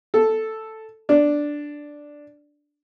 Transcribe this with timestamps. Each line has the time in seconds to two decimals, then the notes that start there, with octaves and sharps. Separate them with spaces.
0.14 A4
1.09 D4